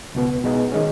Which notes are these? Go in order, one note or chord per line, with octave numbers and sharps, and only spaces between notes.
C#2 B2 B3
B2 G#3 B3 D#4
D#3 G#3 C#4